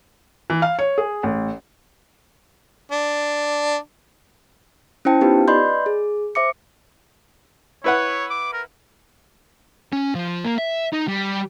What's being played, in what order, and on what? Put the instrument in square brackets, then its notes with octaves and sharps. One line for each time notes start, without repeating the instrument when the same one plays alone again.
[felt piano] E3
F5
C#5
G#4
A1
[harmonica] D4
[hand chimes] C#4 E4 C5 G5 A5
B3 D#4 F4 G4 B4
B4 D5 D#5 B5 C6 G6
G#4
C5 E5 D6 C#7
[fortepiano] E4 B4 F#5 [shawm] C#5
[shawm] D6
A#4
[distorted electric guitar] C#4
F3
A#3
E5
D#4
G3